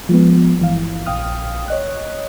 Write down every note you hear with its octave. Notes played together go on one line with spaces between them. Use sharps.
F3 G#3 B3
G1 E3 F5
A#1 F5 G5 D#6 F6
C#5 D#5 F#6